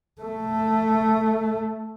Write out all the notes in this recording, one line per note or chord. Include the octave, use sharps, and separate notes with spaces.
A3